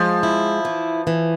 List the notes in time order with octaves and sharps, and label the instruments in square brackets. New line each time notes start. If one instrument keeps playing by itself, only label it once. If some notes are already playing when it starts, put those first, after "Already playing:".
Already playing: [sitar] F3 [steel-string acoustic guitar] G#3
[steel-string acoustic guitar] E4
E3
E3